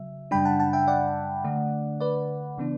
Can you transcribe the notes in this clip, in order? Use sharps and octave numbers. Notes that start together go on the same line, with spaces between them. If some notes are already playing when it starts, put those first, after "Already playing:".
Already playing: C#3 F#3 E5
F#2 C#3 G3 D4 G5 B5
F#5 A5
F#5 A5
E5 G5
D5 F#5
D3 A3 D4
B4 D5
C#3 E3 B3 D4